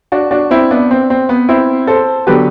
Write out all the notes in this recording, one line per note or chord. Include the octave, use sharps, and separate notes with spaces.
D4 F#4
D4 F#4
C4 E4
B3 D4
C4
C4
B3
C4 E4
A4 C5
D3 F#3 B3 G4 B4